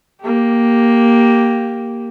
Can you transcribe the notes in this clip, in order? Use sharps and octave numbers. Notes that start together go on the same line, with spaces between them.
A#3 G4